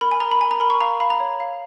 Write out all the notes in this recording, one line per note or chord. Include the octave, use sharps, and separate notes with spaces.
A#4 B5
G#5
A#4 A#5
B5
A#4 G#5
A#5
A#4 B5
C#6
F5 A#5
F5 B5
A#5
C#5
F5